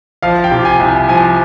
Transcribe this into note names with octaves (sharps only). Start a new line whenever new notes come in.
F3 F5
G5
C3
G#5
C2
F3 G#5